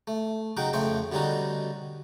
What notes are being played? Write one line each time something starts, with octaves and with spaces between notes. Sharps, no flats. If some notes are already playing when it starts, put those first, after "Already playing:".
A3
C#3 F#3 D#4 F#5 G5
F2 C#3 A3 G5 C6 C#6
B2 D3 G3 C#4 D#4 F#4